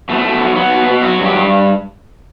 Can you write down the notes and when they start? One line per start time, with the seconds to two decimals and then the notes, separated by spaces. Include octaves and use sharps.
0.09 B2 A3
0.24 B2
0.40 F#3
0.56 F#3 B3
0.71 B2
0.86 B2
1.02 F#3 F#4
1.17 G2
1.25 G4
1.33 G2